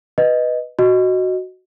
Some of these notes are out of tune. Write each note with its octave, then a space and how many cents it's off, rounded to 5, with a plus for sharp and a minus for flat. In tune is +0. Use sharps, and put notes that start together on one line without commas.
B4 +0 D#5 +0
F#4 +0 D#5 +0